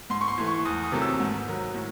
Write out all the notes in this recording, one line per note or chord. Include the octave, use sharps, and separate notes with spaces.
G#2 C6
C#6
C6
E3 A3
C#6
E2 D#6
D#6
C3 D#3 F#3 A3
E6
G#2
D#3 F#3
A2